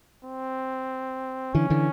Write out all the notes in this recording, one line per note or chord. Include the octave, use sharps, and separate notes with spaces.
C4
D3 E3 C#4
D3 E3